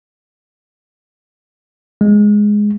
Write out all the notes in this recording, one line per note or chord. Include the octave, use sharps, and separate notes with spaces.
G#3